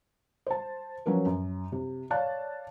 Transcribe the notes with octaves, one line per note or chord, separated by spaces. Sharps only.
C5 A5
F3 F#3 C#4 A#4 B4
F#2
C3
C#5 D5 F5 A5 F#6